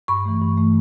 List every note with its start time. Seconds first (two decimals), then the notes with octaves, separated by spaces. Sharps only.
0.08 G2 B5 C#6
0.25 E3 A3
0.41 G2
0.57 E3 A3